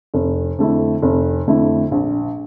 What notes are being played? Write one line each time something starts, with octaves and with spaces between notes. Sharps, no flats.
F1
F2 D3 A3 E4
F1
F2 D3 A3 E4
A#1